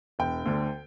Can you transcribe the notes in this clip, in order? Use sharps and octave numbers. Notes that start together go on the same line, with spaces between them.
E1 G5
D2 D3